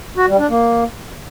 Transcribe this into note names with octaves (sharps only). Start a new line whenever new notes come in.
F#4
G3
D4
A#3